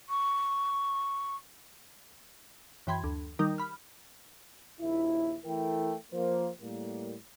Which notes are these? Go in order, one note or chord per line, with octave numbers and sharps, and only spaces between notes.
C#6
F#2 E3 G5 B5 C6 G#6
D2
D#3 G3 D#4 A#4 D#6 G6
B5 F6
A#1 D#2 F3 E4
E3 A3 E4 A4 A#4 G5
F3 A#3 C5
A2 G3 A#3